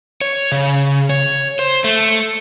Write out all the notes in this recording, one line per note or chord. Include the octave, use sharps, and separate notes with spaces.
C#5
C#3
C#5
C5
A3